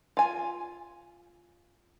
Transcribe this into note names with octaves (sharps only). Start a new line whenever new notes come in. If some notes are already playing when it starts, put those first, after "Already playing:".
F4 G#5